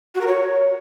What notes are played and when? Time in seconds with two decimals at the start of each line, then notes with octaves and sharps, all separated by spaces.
0.15 F#4
0.21 A#4
0.27 C#5